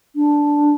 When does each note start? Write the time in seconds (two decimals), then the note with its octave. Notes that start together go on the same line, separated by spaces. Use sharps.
0.16 D4